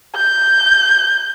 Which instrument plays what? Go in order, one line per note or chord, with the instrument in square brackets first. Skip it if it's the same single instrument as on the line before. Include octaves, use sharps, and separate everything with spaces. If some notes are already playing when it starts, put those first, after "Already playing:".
[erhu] G6